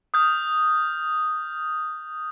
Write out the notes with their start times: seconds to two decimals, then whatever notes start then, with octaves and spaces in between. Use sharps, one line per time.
0.14 D#6 F6 G6